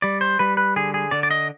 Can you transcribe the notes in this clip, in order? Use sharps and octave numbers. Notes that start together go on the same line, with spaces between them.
G3 D5
C5
G3 B4
B4
D3 G#4
G#4
D3 D5
D5
D#5